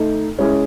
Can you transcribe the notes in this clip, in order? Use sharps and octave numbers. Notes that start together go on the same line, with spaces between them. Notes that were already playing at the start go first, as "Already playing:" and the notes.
Already playing: A3 D#4
G#3 C#4 E4 G#4